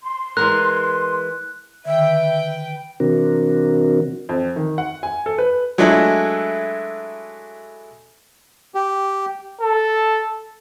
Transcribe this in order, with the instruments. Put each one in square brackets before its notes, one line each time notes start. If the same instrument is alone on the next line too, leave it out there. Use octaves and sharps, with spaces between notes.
[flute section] C6
[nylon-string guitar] E3 G#3 A#4 [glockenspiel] F#6
[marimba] D3 D#3 [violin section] B4 G5 [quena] E5
[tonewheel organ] C3 E3 C4 D4 F#4 A#4
[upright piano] F2
D#3
F#5
G#5
A4
B4
[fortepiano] F#3 G#3 A3 D4 E4
[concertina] G4
[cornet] A4